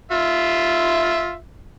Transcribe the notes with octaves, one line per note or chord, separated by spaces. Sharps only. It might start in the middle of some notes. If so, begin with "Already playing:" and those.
F4 E5